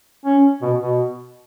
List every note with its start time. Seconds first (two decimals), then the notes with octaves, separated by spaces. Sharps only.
0.25 C#4
0.61 B2
0.79 B2